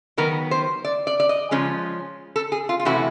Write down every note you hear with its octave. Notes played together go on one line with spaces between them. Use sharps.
D#3 F#3 B3 A#4
C5
D5
D5
D5
D#5
C#3 F3 G#3 C#4
A4
G#4
F4
F4
C3 E3 A3 C#4 E4 F#4